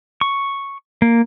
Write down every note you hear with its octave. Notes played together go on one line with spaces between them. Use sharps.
C#6
A#3